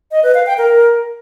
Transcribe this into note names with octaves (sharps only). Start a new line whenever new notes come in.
D#5
B4
F5
G5
A#4